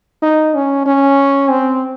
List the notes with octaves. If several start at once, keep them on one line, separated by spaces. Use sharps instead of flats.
D#4
C#4
C#4
C4